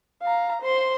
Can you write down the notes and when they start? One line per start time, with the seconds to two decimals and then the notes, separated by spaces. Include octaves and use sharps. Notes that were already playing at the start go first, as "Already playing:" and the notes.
0.22 F5 A#5
0.62 C5 C6